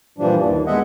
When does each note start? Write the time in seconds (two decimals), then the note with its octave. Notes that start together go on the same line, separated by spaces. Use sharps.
0.18 G2 A#2 E3 F3 G3 D4
0.42 D#2
0.67 G#3 B3 D#5 E5 F#5